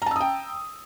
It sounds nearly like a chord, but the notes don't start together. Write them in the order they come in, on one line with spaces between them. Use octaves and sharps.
A#5 A5 E6 D#6 G5